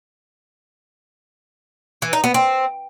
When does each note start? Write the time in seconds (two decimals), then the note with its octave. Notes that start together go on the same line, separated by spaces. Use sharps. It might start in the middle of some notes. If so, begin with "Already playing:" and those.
2.02 E3
2.13 D#4
2.24 B3
2.34 C4